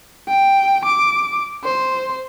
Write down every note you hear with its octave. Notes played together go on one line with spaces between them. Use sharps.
G5
D6
C5